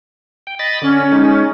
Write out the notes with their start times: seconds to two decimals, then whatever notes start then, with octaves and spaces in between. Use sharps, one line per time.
0.47 G5
0.59 D#5 B5 A6
0.82 D3 C#4
1.12 G#3 D#4